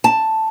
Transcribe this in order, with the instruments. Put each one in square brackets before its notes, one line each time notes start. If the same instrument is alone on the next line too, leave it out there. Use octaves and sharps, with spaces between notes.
[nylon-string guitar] A5